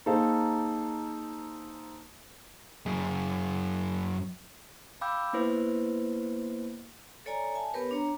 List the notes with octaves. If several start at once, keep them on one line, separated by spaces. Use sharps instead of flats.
A#3 D#4 G#4 A4 C5 F5
F#2 G#4
F5 G5 B5 D6 E6 G6
A#3 B3 E4 B4 C5
A4 C#5 D5 G#5 A#5
E5 G#5 A5
B3 G4 A#4 B4 C#5
D4 C#5 A#5